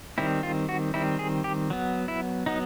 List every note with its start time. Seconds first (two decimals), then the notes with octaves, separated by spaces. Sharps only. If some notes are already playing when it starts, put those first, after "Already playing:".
0.18 D#3 G3 C4 E4
0.43 F4
0.69 F#4
0.94 D#3 G3 C4 E4
1.19 G#4
1.44 G4
1.70 F#3 B3
2.08 E4
2.46 F#3 B3 D#4